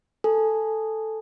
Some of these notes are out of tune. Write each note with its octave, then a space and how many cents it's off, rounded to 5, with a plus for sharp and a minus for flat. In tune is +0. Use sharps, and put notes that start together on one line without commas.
A4 +0 G#5 +0